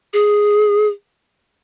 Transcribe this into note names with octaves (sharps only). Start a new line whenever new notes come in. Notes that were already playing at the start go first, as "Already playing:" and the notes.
G#4